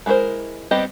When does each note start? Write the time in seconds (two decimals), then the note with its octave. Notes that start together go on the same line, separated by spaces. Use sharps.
0.06 G#3 E4 F4 A#4 C5
0.71 G3 B3 C4 G4 D#5